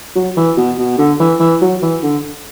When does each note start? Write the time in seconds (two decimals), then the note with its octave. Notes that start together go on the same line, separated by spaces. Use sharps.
0.15 F#3
0.37 E3
0.57 B2
0.79 B2
0.99 D3
1.20 E3
1.40 E3
1.62 F#3
1.82 E3
2.03 D3